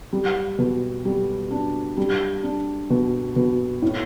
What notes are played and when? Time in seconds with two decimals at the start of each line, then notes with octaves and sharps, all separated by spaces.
0.13 G3
0.58 B2
1.05 G3
1.51 D4
1.97 G3
2.43 D4
2.90 B2
3.36 B2
3.82 A2